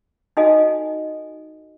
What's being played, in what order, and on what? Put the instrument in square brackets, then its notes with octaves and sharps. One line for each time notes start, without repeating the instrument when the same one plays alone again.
[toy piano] D#4 F#4 A4 D#5 F5 G#5